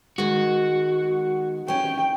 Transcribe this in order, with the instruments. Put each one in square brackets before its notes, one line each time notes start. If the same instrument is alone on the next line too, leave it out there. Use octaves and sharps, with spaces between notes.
[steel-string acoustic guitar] D#3 G#3 [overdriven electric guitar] F#4
[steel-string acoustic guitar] C#4 C#5 [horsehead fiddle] G5